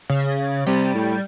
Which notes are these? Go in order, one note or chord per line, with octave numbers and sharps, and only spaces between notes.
C#3
C3 G3
A2